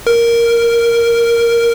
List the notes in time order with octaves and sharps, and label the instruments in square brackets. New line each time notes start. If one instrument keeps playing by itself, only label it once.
[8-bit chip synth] A#4